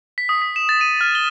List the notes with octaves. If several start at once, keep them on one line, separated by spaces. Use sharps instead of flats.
B6
D#6
B6
E7
A6
D#7
F6
G7